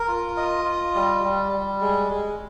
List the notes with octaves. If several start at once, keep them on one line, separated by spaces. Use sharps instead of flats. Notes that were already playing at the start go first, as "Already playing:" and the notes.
Already playing: A#4
F4
D#5
F4
G3
G3
G3
G#3
G#3